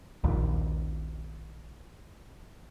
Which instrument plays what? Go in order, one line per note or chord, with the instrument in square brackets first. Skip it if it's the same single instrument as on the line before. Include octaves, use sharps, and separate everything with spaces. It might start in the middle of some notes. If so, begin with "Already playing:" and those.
[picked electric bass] A#1 D#2